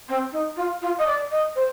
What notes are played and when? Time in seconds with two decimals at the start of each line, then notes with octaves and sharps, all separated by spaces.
0.09 C4
0.32 D#4
0.57 F4
0.82 F4
0.98 D#5
1.06 D5
1.31 D#5
1.56 C5